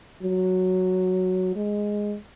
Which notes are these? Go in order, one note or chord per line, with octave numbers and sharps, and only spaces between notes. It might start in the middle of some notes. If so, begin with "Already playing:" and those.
F#3
G#3